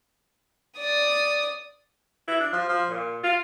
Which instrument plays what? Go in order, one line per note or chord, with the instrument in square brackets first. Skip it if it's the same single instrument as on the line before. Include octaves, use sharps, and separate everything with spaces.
[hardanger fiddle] D5 D#6
[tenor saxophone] E4
D4
F3
F3
A#2
F4